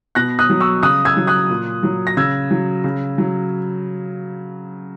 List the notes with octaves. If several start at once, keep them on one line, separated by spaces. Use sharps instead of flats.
B2 F#6 A#6
D#6 F#6
F#3
C#6 E6
C#3 D#6 F#6
E6 G#6
F#3
D#6 F#6
A#2
F#3
A#6
C#3 E6 G#6
F#3
C#3
F#3